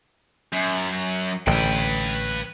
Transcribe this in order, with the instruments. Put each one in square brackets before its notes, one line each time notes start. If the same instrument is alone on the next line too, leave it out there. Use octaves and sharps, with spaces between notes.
[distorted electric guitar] F#2
[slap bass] A1 D3 [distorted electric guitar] B4 G5